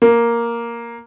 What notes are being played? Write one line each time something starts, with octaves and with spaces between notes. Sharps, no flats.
A#3